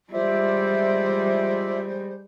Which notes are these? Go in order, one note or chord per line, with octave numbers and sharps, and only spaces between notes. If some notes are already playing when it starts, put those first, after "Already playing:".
G3 G#3 F4 C5 D5 E5